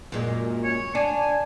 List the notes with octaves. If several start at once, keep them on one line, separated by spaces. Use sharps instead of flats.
F#2 A#2 G#3
C#5
D4 G#5